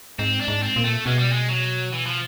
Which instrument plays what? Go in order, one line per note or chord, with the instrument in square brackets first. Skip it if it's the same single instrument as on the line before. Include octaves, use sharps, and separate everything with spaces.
[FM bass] G#2 [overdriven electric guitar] C4
[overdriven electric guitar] D4
[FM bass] G#2
[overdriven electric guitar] C4
[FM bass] A#2
[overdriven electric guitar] A3
[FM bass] B2 [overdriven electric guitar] G#3
[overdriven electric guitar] G3
G#3
F#3
E3
F3